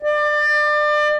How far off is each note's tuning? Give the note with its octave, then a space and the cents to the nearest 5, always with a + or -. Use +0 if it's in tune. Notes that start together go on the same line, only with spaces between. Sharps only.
D5 +30